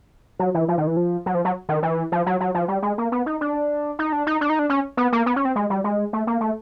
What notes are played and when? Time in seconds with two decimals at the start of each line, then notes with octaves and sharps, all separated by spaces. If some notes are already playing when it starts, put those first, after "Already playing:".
0.39 F#3
0.54 E3
0.68 F3
0.78 D#3
0.87 E3
0.97 F3
1.26 F#3
1.35 F3
1.45 F#3
1.69 D#3
1.83 E3
2.12 F3
2.26 F#3
2.40 F#3
2.55 F3
2.68 G3
2.82 G#3
2.98 A#3
3.12 B3
3.26 D#4
3.41 D4
3.99 D#4
4.13 D4
4.27 D#4
4.41 D4
4.50 D#4
4.59 D4
4.70 C#4
4.97 B3
5.13 A#3
5.26 B3
5.36 C#4
5.45 C4
5.56 G#3
5.70 G3
5.84 G#3
6.13 A3
6.27 A#3
6.41 A3